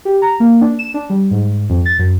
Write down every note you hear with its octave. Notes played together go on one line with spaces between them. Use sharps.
G4
A#5
A#3
D4
E7
D4
G3
G#2
F2
A6
F#2